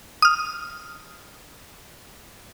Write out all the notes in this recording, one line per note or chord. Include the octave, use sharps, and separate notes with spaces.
D#6 F6